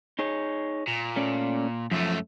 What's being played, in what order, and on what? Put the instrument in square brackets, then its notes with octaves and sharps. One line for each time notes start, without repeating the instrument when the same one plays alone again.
[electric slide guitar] D#4 G#4 C#5
[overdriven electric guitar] A#2
[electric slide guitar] A3 C#4 D5
[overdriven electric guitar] F#2 A3 [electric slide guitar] F3